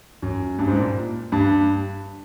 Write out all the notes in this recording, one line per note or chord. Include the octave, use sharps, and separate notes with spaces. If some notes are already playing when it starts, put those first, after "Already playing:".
F#2
G2
G#2
A#2
G2